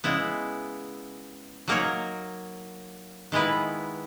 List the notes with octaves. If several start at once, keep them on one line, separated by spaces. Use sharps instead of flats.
C#3 G#3 B3 E4
F#3 A#3 D#4 A#4 C#5
D#3 G#3 B3 E4 B4